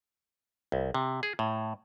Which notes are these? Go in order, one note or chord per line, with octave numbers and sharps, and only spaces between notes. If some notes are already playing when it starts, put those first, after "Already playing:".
C2
C3
G#4
A2